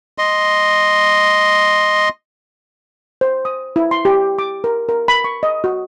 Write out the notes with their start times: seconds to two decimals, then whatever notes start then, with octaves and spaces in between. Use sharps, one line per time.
0.18 D#5 C6
3.21 C5
3.45 D#6
3.76 E4
3.91 C6
4.05 G4
4.39 D6
4.64 A#4
4.89 A#4
5.08 B5
5.24 C#6
5.43 D#5
5.64 F#4